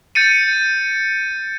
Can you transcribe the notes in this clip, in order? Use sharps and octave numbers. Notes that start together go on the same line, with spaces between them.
G6 A6 C#7 D#7